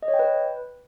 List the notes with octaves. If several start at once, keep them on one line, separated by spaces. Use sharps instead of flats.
D#5
C#5
G5
B4